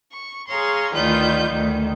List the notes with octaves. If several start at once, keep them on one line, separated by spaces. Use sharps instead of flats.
C#6
G#4 C#5 F5 A#5 C6
D2 D#3 F4 B4 D5 G6
D2 D#3